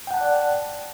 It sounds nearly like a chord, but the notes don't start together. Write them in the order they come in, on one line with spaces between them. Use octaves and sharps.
G5 F#5 A5 F#6 D5